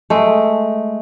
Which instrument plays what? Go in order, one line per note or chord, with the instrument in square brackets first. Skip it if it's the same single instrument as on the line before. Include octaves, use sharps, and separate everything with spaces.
[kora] G#3 A3